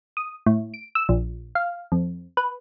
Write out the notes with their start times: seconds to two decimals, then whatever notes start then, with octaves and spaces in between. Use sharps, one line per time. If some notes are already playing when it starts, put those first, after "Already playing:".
0.17 D#6
0.46 A2
0.74 D7
0.95 E6
1.09 A#1
1.55 F5
1.92 F2
2.37 B4